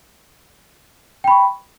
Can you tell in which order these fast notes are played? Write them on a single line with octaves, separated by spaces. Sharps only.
G5 B5 C#6